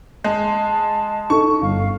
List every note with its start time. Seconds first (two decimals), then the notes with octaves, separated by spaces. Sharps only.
0.24 G#3 A5
1.30 D#4 A4 C#6
1.62 G1 F5